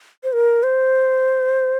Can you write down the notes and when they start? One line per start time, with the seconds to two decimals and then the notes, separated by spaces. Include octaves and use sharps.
0.24 C5
0.33 A#4
0.63 C5